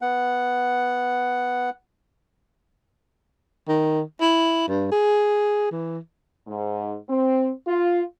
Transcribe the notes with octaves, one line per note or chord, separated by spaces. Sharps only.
B3 F#5
D#3
E4
G2
G#4
E3
G#2
C4
F4